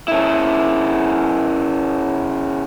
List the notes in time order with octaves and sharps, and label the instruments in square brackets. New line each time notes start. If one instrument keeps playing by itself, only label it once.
[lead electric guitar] C#3 E4